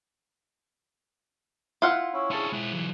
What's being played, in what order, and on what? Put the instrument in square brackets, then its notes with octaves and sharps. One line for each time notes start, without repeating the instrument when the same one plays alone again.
[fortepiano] E4 C6 F6 [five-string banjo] F4 F#5
[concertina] C#4 E4
[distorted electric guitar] D4 C#5 [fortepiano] G#4 A5 C#6
[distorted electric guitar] G#3 E4 [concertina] F#6
[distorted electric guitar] E3 F#3